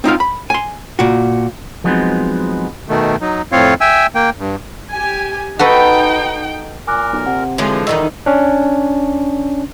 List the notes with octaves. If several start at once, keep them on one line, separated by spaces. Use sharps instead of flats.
C4 D#4 F4 F5
B5
G#5 C6
A#2 F#4
F3 F#3 G#3 B3 C4 D#4
B2 D#3 A3
F#3 D#4
F2 A2 C4 F4 C#5 F5
E5 G5 G#5 E6
A#3 G5
G2
G4 G#5
D#4 F#4 A4 B4 G5
A#2 A#4 G#5 D6 F#6
B1
C3 F#5
D3 E3 F3 G#3 C#5
E2 D#3 G3 D#4 A4 D#5 E6
C#4 D4